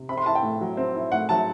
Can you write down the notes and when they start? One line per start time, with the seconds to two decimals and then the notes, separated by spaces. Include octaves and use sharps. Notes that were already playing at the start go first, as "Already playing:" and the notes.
Already playing: C3
0.09 C4 B5
0.18 C6
0.26 E4 A5
0.35 G5
0.43 A2
0.61 F#3
0.77 C4
0.96 E4
1.12 A2 F#5
1.29 F#3 A5